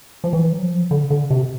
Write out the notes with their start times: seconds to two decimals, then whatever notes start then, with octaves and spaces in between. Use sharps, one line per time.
0.24 F3
0.33 E3
0.52 F#3
0.63 F3
0.91 D3
1.10 D3
1.30 C3